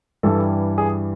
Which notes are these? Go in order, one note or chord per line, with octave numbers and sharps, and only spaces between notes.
G2 E3 G3 A4
G#4